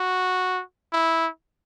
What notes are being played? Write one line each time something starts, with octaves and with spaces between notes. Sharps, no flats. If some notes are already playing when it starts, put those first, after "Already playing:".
Already playing: F#4
E4